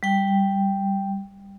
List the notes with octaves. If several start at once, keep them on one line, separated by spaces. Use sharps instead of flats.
G3 G5